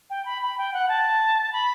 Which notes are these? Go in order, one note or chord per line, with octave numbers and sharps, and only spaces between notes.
G5
B5
B5
G5
F#5
A5
B5